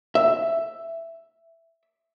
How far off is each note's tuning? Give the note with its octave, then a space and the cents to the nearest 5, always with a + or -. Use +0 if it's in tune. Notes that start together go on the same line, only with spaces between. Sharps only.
E5 +5